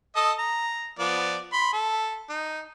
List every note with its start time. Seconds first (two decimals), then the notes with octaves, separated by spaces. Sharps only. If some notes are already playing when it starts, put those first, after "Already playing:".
0.16 A4 D#5 D#6
0.39 A#5
0.99 F3 B3 D5
1.53 B5 C6
1.73 A4
2.30 D#4